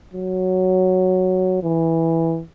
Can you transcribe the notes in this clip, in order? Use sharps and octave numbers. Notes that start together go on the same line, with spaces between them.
F#3
E3